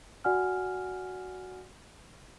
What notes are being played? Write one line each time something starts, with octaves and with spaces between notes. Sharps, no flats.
F#4 D5 F#5 G#5 F6